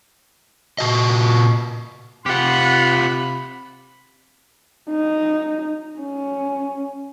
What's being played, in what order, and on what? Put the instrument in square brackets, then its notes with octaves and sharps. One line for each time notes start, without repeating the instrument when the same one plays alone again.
[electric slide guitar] A#2 F#4 D#5
[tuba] C3 [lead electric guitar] F4 G4 [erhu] F#5 [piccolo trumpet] B5
[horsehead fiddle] D#4
C#4